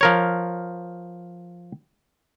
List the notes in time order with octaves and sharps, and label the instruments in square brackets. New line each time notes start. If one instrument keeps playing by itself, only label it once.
[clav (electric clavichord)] F3 A#4 C#5